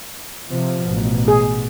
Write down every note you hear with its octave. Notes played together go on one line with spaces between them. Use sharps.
C3 F3
A1 B2
G#4